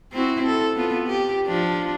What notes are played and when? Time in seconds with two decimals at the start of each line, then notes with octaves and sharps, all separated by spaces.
0.12 C4 E4 F#4
0.46 A4
0.76 B3 F4
1.07 G4
1.47 F3 D4